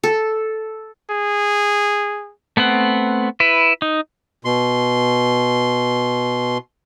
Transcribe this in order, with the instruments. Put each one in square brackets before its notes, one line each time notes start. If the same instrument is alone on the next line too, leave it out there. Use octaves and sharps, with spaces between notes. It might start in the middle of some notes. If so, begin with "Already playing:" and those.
[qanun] A4
[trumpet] G#4
[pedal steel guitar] A3 B3 C4 F#5
E4 B4
D#4
[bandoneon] B2 C6